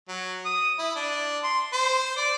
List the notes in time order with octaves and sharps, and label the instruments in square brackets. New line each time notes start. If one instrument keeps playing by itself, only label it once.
[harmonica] F#3
D#6
E4
D4
C6
C5
D5